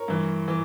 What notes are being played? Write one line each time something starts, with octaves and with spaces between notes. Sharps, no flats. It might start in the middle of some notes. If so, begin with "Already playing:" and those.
Already playing: A#4 C#5
G2 E3
E3